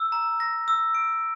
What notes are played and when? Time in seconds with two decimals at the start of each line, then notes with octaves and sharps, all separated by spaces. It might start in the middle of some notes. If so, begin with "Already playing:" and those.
Already playing: E6
0.12 A#5
0.40 A#6
0.68 E6
0.95 D7